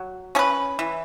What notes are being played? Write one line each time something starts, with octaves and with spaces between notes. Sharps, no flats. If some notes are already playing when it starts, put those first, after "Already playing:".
Already playing: F#3
C#4 G#4 B4
E3